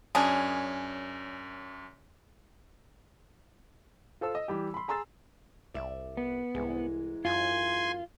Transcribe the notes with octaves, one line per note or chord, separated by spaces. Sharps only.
F#2 C#4 D4 G#4
F4 A4 C5 E6
D#5
E3 G3 G4
B5 C6
G#4 A#5 C6 E6 A6
C2 D5 E5
B3
C2 G#2 E3 G#3
F#2 F4 G#5 C6